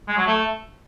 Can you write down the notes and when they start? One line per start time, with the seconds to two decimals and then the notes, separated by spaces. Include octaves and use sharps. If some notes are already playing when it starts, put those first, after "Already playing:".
0.08 G#3
0.17 F#3
0.27 A3